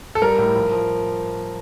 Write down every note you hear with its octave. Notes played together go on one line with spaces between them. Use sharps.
A4
G3 A#4
A2
F3
F3